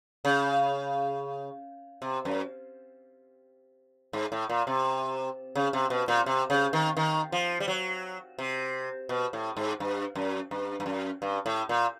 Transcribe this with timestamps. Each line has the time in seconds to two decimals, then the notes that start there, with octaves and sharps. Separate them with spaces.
0.25 C#3
2.02 C3
2.25 F#2
4.13 G#2
4.32 A2
4.49 A#2
4.67 C3
5.55 C#3
5.73 C3
5.90 B2
6.08 A#2
6.26 C3
6.50 C#3
6.73 D#3
6.97 D#3
7.32 F3
7.60 G3
7.68 F#3
8.39 C3
9.09 B2
9.33 A2
9.57 G#2
9.80 G2
10.15 F#2
10.51 G2
10.80 G2
10.86 F#2
11.22 G2
11.46 A2
11.69 A#2